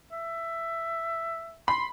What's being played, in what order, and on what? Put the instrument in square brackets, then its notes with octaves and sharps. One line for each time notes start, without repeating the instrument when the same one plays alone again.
[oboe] E5
[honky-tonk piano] B5 [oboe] C6